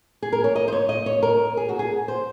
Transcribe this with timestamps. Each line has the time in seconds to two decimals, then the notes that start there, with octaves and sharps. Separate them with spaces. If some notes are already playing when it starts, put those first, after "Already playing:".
0.22 G#4
0.33 A#4
0.44 C#5
0.56 D#5
0.68 C5
0.72 C#5
0.89 D#5
1.06 C#5
1.23 A#4
1.57 G#4
1.69 F#4
1.79 G#4
2.08 C5